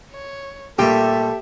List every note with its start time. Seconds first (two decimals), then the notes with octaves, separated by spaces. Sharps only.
0.12 C#5
0.79 A#2 G3 A3 G4 A4 E5